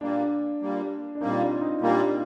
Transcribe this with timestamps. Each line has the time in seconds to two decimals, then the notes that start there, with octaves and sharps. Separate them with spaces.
0.01 A#2 G3 A#3 D4
0.61 A#2 G3 A#3
1.15 D4
1.20 A#2 G3 A#3 C4 D#4
1.40 D4 F4
1.61 C4 D#4
1.80 A#2 G3 A#3 D4 F4